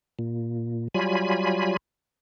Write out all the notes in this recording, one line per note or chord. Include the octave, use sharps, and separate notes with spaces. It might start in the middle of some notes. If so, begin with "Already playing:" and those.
A#2
F#3 G3 F4 G#5 B5